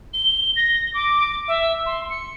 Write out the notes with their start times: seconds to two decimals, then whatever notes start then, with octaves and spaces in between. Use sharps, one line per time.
0.13 G7
0.56 A#6
0.93 D6
1.47 E5
1.86 C6
2.09 C#7